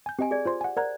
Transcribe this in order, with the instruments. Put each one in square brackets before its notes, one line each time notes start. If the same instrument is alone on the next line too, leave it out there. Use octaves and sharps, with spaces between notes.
[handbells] G#5 G6
[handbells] C4 D#5 [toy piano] G4 G#5
[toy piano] G#4 D5
[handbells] F4 C5 C6
F#5 G#5
[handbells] A#4 F#5 A#5 [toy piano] C5 D5